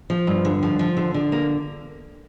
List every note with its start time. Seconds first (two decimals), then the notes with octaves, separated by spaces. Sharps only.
0.10 F3
0.27 G2
0.45 D3
0.63 F3
0.79 F3
0.97 D3
1.14 D3
1.32 A#3